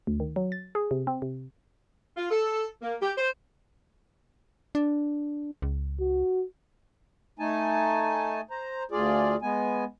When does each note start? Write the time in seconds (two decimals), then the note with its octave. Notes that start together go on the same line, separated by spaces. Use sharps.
0.07 D2
0.20 D#3
0.36 F#3
0.52 A6
0.75 G#4
0.91 C3
1.07 C4
1.22 C3
2.16 F4
2.30 A4
2.82 A#3
3.00 G4
3.17 C5
4.75 D4
5.62 C#2
6.00 F#4
7.39 A3 D#4 G#5 A5
8.51 C5 A#5
8.91 D2 F4 G#4 D5
9.42 G#3 B3 G#5